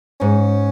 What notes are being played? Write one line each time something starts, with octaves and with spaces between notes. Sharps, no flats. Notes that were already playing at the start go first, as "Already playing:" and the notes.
G#2 C#4